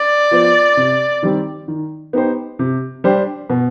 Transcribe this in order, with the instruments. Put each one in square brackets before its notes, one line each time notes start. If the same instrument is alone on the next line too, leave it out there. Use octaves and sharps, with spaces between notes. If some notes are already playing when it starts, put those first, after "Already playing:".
Already playing: [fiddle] D5
[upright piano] F3 B3 F4 C5
C3
D#3 G3 C4
D#3
B3 D#4 G4 C5
C3
G3 D4 G4 C5
B2